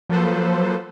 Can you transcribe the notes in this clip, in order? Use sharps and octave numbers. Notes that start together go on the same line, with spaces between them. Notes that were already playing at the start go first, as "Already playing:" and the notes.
F3 F#3 A#3 A4 B4 C5